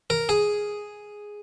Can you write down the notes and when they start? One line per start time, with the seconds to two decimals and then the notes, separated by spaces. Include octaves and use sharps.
0.10 A#4
0.29 G#4